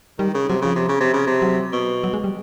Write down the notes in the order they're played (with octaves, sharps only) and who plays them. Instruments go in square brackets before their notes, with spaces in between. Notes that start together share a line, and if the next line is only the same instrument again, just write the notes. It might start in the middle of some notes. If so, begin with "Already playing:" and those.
[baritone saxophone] D#3 [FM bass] G3
[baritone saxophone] C#3
[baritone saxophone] C3 [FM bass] F#3
[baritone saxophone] C#3 [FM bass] F3
[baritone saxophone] C3
C#3
C3
C#3
C3
[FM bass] F#3
[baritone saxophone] B2
[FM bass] F#3
G#3
G3